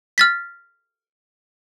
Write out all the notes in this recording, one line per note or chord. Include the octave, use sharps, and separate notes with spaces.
F6 A6 B6